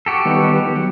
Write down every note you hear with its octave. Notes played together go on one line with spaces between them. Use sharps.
F#4 G4 A4
D#3 G3 B3
F#3